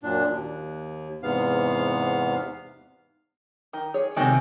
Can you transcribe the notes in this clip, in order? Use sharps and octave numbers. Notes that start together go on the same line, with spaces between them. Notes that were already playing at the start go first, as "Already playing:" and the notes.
F#2 A#2 D4
D#2
E2 G#2 C3 B3 F5
D#3
G#4 C#5
C3 D#3 G#3 F#4 G5